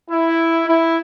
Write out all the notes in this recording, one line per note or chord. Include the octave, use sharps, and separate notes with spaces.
E4
E4